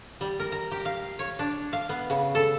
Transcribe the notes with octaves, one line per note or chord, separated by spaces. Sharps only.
G3
A#4
A#5
G4
F5
C#5
D4
F5
B3
C#3
A4